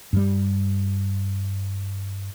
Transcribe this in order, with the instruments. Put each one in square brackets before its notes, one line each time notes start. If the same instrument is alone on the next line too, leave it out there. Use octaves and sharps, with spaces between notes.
[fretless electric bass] G2 G3